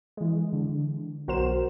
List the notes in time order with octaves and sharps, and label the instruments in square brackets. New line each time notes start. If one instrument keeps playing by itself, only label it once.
[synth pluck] E3 G#3
D3
B1 F#4 A#4 C5 E7